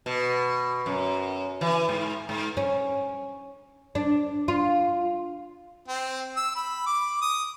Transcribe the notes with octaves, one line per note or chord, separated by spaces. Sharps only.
B2
F#2
E3
G#2
G#2
C#4
D4
F4
C4
E6
B5
D6
D#6